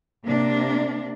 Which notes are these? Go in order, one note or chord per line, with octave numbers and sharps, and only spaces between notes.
C3 A#3 D4